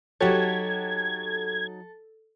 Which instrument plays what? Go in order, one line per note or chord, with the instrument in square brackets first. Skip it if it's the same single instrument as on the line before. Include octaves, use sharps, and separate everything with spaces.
[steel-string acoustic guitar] F#3 D#4 [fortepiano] F#4 G4 C#5 [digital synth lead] A4 [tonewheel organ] G#6